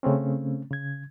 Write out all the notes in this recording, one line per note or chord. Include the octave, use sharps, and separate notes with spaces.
C#3 A3 C4 C#4
C#3 G#6